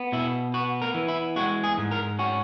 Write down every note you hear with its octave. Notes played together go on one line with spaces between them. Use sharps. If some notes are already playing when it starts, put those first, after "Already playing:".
Already playing: B3
B2 E4
B3 F#4
A#4
E3
E4
G#3 F#4
G#4
G#2
A#4
C#4 F#4